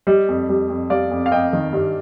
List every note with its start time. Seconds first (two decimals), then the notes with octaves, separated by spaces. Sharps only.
0.07 G3 D#5
0.28 F2
0.49 G3
0.69 F2
0.90 G3 D5 F5
1.11 F2
1.26 F5
1.32 F2 D#5 G5
1.53 D#3
1.73 G2